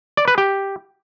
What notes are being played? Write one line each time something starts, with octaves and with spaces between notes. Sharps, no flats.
D5
B4
G4